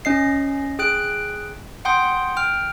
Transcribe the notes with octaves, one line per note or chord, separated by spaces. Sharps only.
C#4 D#5 C7
G#4 G5 F#6 D7
F#5 G5 C6 D#6 G6
G5 F6